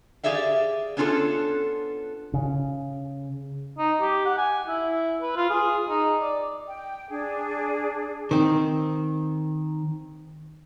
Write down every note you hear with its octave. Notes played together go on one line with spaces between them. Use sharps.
G4 G#4 D5 E5 F5
B3 C#4 D4 F4 G4 A4
C#3
D#4
G4
F#5
G#5
E4
B4
F4
G#4
D#4
D5
G5
D4 G#4
D#3 C4